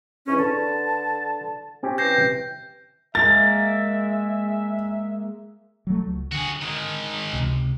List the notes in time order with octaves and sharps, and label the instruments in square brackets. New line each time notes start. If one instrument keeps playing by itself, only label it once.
[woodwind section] C#2 E3 C#4
[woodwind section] D3 A5 [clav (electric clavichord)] B4
[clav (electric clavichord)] C4 C#4 G4
[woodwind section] E3 G5 [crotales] G6 A#6 C7
[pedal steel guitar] G#3 A#3 A#4 [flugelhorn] E5 [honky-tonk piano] A6
[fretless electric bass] F#3 A3
C#2
[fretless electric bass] D3 [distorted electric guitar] F#4 G#4
[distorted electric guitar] D#3 G#3
[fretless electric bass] C#2 C3